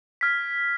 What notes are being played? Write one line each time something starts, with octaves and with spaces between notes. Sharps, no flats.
F6 G#6 B6